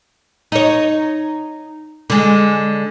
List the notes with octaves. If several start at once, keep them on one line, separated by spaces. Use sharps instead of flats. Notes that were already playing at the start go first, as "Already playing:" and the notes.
D#4 C#5
D3 G#3